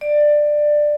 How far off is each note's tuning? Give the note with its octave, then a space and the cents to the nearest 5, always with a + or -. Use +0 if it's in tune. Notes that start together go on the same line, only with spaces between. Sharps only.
D5 +15